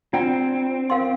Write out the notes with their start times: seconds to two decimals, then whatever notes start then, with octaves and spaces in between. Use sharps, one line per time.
0.13 C4 D4 F4 D5 G5 A#5
0.90 A#4 F5 C6